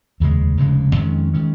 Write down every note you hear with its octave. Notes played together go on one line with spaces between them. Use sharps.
F1 D#2 C#3 G#3
F1 D#2 C#3 G#3
F2 D#3 G#3 C#4
D#3 G#3 C#4